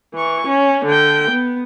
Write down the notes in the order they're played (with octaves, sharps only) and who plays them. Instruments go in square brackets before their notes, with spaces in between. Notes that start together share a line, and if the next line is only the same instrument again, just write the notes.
[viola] E3 C#6
C#4
D3 G5
B3